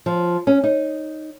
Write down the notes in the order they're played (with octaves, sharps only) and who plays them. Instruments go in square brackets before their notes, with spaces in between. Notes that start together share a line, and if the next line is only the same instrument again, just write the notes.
[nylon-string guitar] F3
C#4
D#4